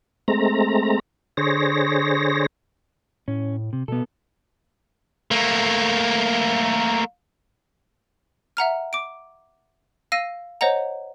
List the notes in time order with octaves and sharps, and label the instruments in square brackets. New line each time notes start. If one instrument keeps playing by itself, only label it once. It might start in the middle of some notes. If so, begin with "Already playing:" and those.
[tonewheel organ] G#3 A3 C4 A#5
D3 G#4 C5 C#5 A#6
[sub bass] A2 [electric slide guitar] C#4
[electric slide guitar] C3
[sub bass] B2 [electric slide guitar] B3 A4
[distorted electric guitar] A3 A#3
[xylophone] E5 F#5 A#5 F6
D6 D7
F5 E6 A#6 D#7
C5 C#5 D#5 F#5 A#5